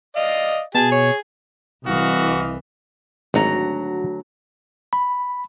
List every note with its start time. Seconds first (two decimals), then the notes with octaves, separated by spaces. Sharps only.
0.16 D5 D#5 F5
0.75 B2 G#4 A5
0.92 C#5
1.87 C2 E3 F#4 D#5 F5
3.34 G#1 D2 F#3 A#5
4.93 B5